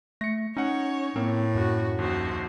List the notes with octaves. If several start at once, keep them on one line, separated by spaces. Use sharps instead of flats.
A3 A#6 C#7
C#4 D#4 C#5 F#5 C#7
A2 A#3 C4
F#2 F#4
A#1 D#2 F#4 C5